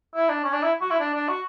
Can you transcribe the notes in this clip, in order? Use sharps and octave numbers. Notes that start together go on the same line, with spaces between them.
E4
D4
C#4
D4
E4
F#4
E4
D4
D4
F#4